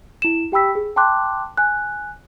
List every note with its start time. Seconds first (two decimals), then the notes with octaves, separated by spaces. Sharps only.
0.22 E4 E7
0.52 G4 G5 B5 E6 B6
0.75 G#4
0.96 G5 A5 C6 D6 F#6
1.57 G#5 F#6